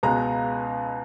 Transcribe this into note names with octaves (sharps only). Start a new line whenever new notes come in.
C#2 B2 G#3 B3 A#5